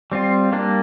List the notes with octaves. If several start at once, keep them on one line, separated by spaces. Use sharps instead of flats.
G3 C4 F4
G3 A#3 D4